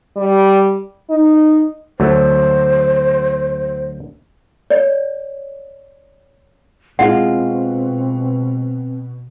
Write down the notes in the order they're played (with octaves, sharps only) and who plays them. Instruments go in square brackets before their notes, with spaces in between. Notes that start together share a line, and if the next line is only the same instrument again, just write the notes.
[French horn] G3
D#4
[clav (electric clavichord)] D2 F#3 A3 [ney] C5
[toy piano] C#5 D5
[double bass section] B2 [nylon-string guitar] G#3 F4 [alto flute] C4 [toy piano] F#5